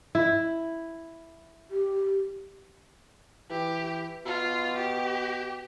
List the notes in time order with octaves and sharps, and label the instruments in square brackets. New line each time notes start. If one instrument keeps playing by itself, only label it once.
[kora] E4
[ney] G4
[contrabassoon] E3 [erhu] G4
[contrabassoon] B2 [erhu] F4
[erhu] G4